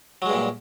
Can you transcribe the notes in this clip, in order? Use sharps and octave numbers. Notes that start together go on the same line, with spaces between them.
G2 A#2 F#3 G#3